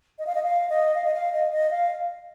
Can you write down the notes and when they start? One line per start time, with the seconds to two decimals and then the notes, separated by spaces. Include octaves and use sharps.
0.19 D#5
0.27 F5
0.35 D#5
0.43 F5
0.69 D#5
0.95 F5
1.04 D#5
1.14 F5
1.33 D#5
1.52 D#5
1.71 F5